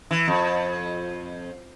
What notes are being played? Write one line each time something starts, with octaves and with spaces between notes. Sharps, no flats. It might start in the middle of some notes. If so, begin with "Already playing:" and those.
E3
F2